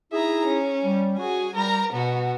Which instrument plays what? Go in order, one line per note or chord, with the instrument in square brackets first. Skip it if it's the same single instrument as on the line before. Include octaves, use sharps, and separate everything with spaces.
[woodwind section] D#4 E4 G#4 [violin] E5 A#5
[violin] C#4
[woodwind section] G3
[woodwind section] F#4 [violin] G#4 G#5
[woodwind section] G3 [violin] A#4 A#5
[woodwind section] B2 [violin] B3 F#4